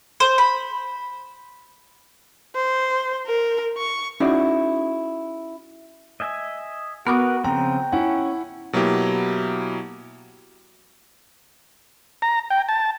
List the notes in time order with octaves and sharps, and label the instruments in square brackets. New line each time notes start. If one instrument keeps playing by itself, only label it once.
[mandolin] C5
B5
[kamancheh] C5
A#4
C#6
[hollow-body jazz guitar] C#4 D#4 E4 F#4 G#4 D5
[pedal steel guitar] D#5 E5 G#5
[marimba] B3 D6 D#6 [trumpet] F#4 [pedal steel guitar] A#4 B4
[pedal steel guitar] C#3 F3 C4 [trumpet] G5 [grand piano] A#5
[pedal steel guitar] C#4 [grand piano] E4 F#5
[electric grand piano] B2 F#3 A#3 E4 G4
[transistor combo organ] A#5
G5
A5